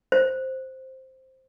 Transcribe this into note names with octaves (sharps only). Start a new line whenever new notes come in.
C5